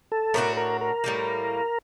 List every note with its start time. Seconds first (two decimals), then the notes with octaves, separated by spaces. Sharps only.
0.12 A4
0.34 A2 A3 D4 F#4 A#4
0.57 A#4
0.81 A#4
1.04 A2 G3 A#3